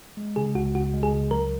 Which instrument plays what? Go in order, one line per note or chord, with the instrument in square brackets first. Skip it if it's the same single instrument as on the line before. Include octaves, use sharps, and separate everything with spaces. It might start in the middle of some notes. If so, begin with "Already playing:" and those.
[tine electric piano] G#3
[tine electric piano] C#3 [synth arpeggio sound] G#4
[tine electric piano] C#2 [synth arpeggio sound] F#4
[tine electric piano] C#2 [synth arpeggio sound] F#4
[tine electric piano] G#3
[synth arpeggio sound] G#4
[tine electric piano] C#2
[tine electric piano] F#3 [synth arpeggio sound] A#4